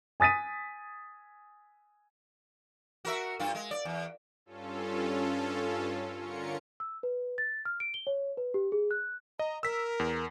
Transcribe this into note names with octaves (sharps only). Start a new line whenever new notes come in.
G#5 D#6 A6 B6 D#7
F#4 A#4 E5
G2 F4
G#3
D5
E2
G2 C#4 F4 A4
D3 C#4 F4 A#4 C#7
E6
B4
A6
F6
D7
G7
C#5
B4
G4
G#4
F#6
D#5 A#5
A#4 E6 B6
E2